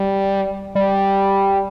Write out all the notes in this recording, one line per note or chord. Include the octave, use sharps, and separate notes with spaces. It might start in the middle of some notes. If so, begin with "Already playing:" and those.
Already playing: G3
G3